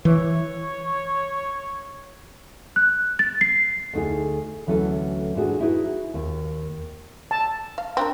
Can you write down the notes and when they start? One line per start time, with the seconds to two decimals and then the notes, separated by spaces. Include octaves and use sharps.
0.05 E3 C#5
2.76 F#6
3.19 A6
3.41 C7
3.93 D2 D#4 G#4
4.67 D2 E3 F#3 C#4 A4 B4
5.35 G#2 E3 D4 F#4 G#4 A5
5.60 D#4 E4 F#4 G#4 B4
6.14 D#2
7.31 A5
7.78 F5
7.97 C4 D4 A#4